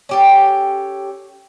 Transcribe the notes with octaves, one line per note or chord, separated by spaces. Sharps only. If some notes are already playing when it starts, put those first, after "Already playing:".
C#4 G4 A4